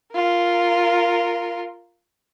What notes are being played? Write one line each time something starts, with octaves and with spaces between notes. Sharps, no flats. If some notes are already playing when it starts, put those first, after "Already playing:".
F4 A#4